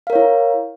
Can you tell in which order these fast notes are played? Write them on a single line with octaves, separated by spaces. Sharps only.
F5 A#4 C#5 E4